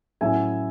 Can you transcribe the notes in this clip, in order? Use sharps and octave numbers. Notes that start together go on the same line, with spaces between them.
A2 F#3 A3 C#4 E4 E5 G#5